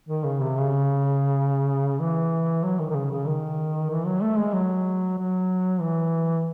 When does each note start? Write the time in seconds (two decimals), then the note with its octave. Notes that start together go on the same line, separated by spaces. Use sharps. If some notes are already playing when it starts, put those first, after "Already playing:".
0.09 D#3
0.24 C#3
0.40 C3
0.56 C#3
2.00 E3
2.63 F#3
2.79 D#3
2.90 D#3
2.95 C#3
3.11 C#3
3.27 D#3
3.90 E3
4.06 F#3
4.22 A3
4.38 G#3
4.54 F#3
5.18 F#3
5.81 E3